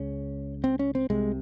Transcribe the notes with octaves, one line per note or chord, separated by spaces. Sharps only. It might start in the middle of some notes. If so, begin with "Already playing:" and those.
Already playing: C#2 C#3 C#4
C4
C#4
C4
C2 C3 G#3